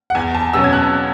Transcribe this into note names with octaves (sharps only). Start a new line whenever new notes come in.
F#5
E2 G#5
A5
B2 F#3 C#4 E6
G#6
F#6